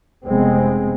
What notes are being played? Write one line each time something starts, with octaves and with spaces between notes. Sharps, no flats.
F1 C3 G#3 B3 C4